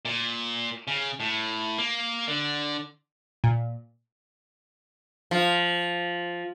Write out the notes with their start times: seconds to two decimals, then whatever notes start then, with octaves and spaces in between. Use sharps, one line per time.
0.05 A#2
0.88 C#3
1.20 A2
1.78 A#3
2.28 D3
3.44 A#2
5.31 F3